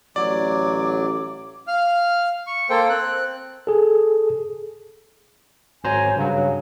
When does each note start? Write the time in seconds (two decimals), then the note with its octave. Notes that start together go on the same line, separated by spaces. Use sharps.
0.16 A1 F#3 D5 D6
1.68 F5 F6
2.47 C#6
2.70 A#3 A4 C5 G5
2.90 C4 F#6
3.67 G#4 A4
5.84 G#1 F#3 C5 G#5 A#5
6.16 G2 C#3 F#3